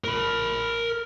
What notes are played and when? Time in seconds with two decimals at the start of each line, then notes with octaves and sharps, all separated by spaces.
0.04 A#4 B5